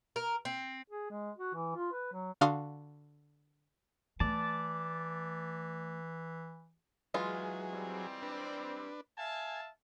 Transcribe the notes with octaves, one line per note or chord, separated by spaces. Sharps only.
A#4
C4
G#4
G#3
F#4
E3
F4
B4
F#3
D3 D4 F#4 F5 C6 D#6
E3 A3 D5 A5
E3 F#3 G#3 F4 G#4
G3 C4
D4 B4
E5 F5 G#5 A5